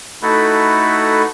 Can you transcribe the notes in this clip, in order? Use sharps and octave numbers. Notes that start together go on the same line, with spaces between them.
A3 D#4 E4 F#4 A4 B4